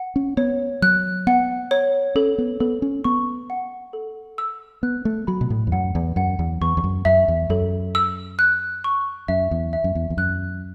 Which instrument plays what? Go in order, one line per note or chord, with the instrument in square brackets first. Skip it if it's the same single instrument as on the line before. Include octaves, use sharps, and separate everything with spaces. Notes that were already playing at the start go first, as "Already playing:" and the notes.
Already playing: [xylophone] F#5
[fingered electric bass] C#4
[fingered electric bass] B3 [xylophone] C#5
[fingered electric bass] F#3 [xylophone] F#6
[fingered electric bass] B3 [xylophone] F#5
[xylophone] C#5
[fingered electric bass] C#4 [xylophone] A4
[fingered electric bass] B3
[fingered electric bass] B3 [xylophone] A4
[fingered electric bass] C#4
[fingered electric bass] B3 [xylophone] C#6
[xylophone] F#5
A4
E6
[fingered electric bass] B3 [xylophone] F#6
[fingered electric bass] A3
[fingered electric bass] F#3 [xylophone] B5
[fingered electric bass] B2
A2
E2
[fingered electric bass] F#2 [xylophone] F#5
[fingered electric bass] E2
[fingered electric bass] F#2 [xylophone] F#5
[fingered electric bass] E2
[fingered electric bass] E2 [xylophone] C#6
[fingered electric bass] E2
F#2
[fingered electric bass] F#2 [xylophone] E5
[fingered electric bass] E2
[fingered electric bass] F#2 [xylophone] A4
[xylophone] E6
F#6
C#6
[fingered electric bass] F#2 [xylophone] E5
[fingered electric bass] E2
[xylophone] E5
[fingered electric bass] F#2
E2
E2
[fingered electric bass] F#2 [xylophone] F#6